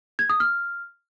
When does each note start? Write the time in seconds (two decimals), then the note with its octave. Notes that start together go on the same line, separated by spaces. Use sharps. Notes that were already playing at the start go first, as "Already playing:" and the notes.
0.19 G#6
0.30 D#6
0.40 F6